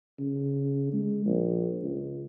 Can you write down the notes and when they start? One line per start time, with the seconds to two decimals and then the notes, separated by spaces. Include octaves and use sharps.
0.19 C#3
0.93 G#3
1.25 A#1
1.83 C#2